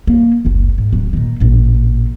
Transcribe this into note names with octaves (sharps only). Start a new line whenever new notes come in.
A#3
F#1 C#2
G#2
D1 F#3
A#2 D#3
A1 A#2